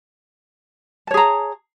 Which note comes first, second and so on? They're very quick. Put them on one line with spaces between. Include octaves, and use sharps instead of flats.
A5 C#5 G#4 A#5